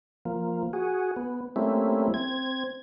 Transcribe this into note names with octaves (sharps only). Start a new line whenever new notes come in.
F3 A#3
F#4 G#4
B3
G3 A3 A#3 C4 C#4 E4
C4 G#6